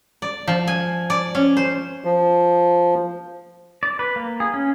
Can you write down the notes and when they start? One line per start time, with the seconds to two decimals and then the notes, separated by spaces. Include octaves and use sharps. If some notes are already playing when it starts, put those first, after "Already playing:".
0.22 D5
0.47 F3
0.68 G#5
1.10 D5
1.35 C#4
1.57 C5
2.04 F3
3.83 D5
3.99 B4
4.16 A#3
4.40 G#4
4.54 C#4